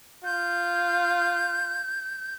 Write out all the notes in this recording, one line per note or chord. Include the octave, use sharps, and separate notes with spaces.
F4 G6